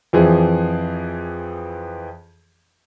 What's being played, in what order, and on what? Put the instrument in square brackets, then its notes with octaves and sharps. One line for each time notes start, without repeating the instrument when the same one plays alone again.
[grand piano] F2 E3 F3 G#4 C5